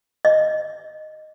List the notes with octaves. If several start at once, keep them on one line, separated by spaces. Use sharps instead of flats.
D#5